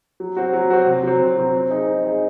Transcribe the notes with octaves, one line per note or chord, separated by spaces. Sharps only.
F#3
C4 F#4
F#3
C4 F#4
C3
F#3 C4
C3
F#3 C4
C4
D#4 G#4 D#5
C4
D#4 G#4 D#5